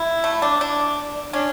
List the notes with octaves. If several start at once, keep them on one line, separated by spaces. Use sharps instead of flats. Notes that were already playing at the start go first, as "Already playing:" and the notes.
Already playing: E4
A3
D4
D4
C#4 D4